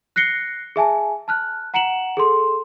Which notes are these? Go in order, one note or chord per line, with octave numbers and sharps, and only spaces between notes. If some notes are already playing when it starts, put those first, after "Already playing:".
F#6 A#6 C7 C#7 G7
G#4 E5 G#5 A5
A5 F6 F#6
F#5 A#5 C#7 D7 E7 F#7
G#4 A4 C6